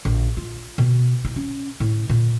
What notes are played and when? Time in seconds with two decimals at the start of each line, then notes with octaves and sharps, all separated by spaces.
0.05 A#1
0.37 F4
0.78 B2
1.25 D#4
1.36 C#4
1.80 A2
2.10 A#2